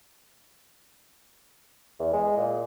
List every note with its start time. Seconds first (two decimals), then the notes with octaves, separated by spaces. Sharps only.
1.99 E2
2.13 G#3
2.37 A#2